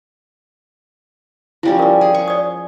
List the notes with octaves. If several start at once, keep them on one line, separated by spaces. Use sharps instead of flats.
F3 G3 C#4 E4
F4 A#4
G#4
C#6
D5 D#6